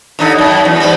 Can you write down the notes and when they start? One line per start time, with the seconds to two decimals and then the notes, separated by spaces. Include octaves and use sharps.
0.19 D#2 D3 D#4
0.38 F#2
0.65 E2
0.80 G#2 G3